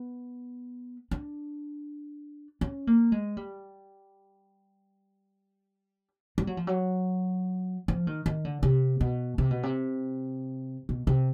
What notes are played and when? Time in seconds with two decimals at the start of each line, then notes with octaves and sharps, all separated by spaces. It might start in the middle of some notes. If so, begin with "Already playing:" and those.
Already playing: B3
1.11 D4
2.61 C#4
2.87 A#3
3.12 G#3
3.37 G3
6.38 G3
6.47 F#3
6.57 F3
6.67 F#3
7.88 F3
8.07 D#3
8.26 D#3
8.45 D3
8.63 C3
9.01 B2
9.38 C3
9.51 B2
9.63 C3
10.89 B2
11.07 C3